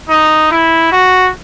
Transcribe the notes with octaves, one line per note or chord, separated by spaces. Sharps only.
D#4
E4
F#4